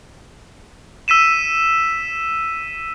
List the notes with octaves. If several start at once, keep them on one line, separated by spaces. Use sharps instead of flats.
E6 B6 D#7 E7